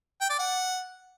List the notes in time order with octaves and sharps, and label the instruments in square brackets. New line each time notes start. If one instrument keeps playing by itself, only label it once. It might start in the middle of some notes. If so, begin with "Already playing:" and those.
[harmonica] G5
D5
F#5